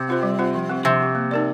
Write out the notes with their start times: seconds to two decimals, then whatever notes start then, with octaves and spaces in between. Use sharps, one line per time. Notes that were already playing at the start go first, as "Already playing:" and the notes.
Already playing: C3
0.08 C4 F4 C5
0.23 G3
0.39 C4 F4 C5
0.55 F3
0.69 C4 G4
0.84 C3 F3
1.00 C4 G4
1.15 A#3
1.31 D#4 A#4 D5